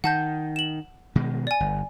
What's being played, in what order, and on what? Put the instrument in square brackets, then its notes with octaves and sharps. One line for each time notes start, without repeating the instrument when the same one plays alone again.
[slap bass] D#3 [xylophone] F#5 A5 G6
[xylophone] E7 F#7
[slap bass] B2 D#3 G#3
[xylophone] D5 G#5
[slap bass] G1